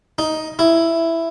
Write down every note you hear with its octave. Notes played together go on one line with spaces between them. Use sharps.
D#4
E4